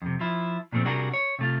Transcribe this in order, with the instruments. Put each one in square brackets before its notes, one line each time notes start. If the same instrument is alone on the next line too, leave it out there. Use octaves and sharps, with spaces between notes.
[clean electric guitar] F2 C3
F3 E4
A#2 F3 A3 C4
C3 G3 D4 F#4 G#4 A#4
C#5
C3 A3 F4